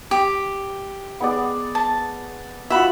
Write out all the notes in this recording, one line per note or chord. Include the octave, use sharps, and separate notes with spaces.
G4
B3 G#4 D5
A5
F4 F#4 E5 B5